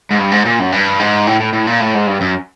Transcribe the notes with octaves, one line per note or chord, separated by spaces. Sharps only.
G#2
G2
G#2
A#2
F#2
G2
G#2
A2
A2
A2
A#2
A2
G#2
G2
F#2